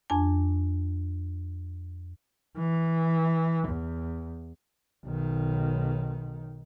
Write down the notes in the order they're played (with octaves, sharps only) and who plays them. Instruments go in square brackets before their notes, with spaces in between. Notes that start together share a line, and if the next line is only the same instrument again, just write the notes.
[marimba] F2 D4 G#5
[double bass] E3
E2
B1 D#3